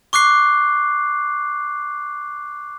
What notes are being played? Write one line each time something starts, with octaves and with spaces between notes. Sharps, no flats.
C#6 D6 F#6 C7